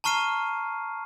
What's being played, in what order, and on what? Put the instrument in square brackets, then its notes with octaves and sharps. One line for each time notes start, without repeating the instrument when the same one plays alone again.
[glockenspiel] A5 A#5 C#6 F6 C7 D#7